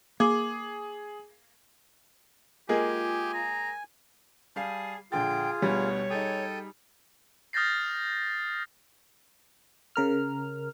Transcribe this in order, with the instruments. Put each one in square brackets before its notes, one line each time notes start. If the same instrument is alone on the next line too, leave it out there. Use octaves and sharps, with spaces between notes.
[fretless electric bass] A#3 [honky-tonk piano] G#4 [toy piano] D6
[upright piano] G#3 A#3 G#4 [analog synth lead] F4 [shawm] G4 [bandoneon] G#5
[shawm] A#5
[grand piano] G3 F5 C7 [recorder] G#4 [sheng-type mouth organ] A5
[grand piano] A#1 D3 A6 [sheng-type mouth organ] F4 G#4 [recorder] G5
[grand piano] D2 B2 [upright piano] G3 [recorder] C#5
[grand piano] D#4 G#4 [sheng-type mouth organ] A4 G5 D#6
[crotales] D#6 F6 G6 A6 A#6 C7
[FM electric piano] C#3 A#4 F6